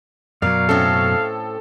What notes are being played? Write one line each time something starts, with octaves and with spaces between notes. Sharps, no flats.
F#2 B2 F#3 A#4 D5 F5
A2 C4 C#4 A4